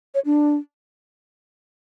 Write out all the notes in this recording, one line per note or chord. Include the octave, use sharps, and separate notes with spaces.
C#5
D4